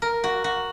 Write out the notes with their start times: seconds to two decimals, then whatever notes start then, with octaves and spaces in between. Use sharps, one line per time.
0.02 A#4
0.24 F#4
0.44 F#4